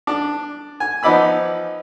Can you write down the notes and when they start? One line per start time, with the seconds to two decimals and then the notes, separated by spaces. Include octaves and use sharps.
0.07 D4
0.80 G#5
1.03 F3 B3 D#4 D5 B5 E6